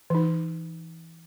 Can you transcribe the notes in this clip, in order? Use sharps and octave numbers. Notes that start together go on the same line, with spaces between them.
E3 D#4